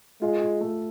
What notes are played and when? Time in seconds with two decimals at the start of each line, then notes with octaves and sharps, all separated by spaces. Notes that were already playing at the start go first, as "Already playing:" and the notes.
0.21 G#3 F4
0.41 F4
0.61 A3